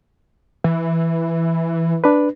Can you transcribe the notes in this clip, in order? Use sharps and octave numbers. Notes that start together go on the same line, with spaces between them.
E3
D4 B4